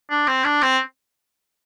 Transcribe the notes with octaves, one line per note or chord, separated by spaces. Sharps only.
D4
C4
D4
C4